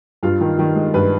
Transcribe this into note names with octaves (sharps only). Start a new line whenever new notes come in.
G2 F4
D#3
D#3
G#3
G2 B4